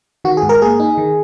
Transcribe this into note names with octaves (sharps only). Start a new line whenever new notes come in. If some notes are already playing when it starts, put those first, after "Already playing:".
D#3 F#4
G#4
G#2
A#4
A#3 G#4
D#4
D#3